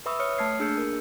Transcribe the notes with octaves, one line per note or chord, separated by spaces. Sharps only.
B4 E5 B5 C#6 D#6 E6
C#5 D#6 F6 C#7
A3 A5 F6 G#6 C7
A#3 D4 G#4 E6 G6 C#7
A#4